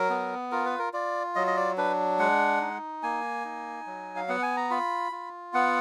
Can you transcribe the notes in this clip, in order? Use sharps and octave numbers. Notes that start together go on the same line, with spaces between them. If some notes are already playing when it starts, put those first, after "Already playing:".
Already playing: F#3 A#4
B3
F4 A#4
B4
A#4
F4 D5
F#3 D#5
D#5
D5
D4 B4
G#3 F#5
D#4
A#3 G#5
D#4
F#3
F5
B3 F#5
G#5
A#5
F4 B5
F4
B3 F#5